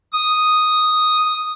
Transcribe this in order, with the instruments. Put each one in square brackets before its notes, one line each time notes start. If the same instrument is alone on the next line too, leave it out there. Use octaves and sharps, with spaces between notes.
[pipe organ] D#6